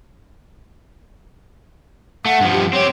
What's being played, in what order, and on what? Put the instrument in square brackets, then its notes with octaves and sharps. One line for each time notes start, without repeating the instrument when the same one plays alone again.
[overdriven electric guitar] A3 [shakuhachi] F#5
[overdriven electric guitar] G2 F3
[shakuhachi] G4
[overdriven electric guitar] C4 G4 [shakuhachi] C#5